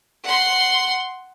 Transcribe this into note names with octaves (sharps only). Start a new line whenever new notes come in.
F#5 C6